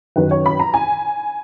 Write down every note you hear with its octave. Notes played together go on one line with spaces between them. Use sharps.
F#2 D#3 F#3 B4
C#5
B5
A#5
G#5